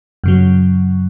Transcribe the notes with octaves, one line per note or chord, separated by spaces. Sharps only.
F#2 C#3 F#3